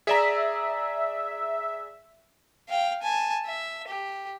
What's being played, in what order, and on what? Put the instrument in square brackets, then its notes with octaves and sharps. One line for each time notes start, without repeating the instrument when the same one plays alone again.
[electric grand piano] G#4 D5 A#5 [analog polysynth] E5
[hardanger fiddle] F5 G5
G#5 A5
E5
G4